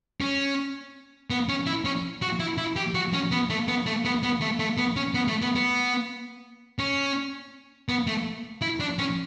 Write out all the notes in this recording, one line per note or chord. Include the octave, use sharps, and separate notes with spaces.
C#4
B3
C#4
E4
C#4
F#4
E4
E4
G4
F#4
C#4
B3
A3
B3
A3
B3
B3
A3
A3
B3
C#4
B3
A3
B3
B3
C#4
B3
A3
E4
D4
C#4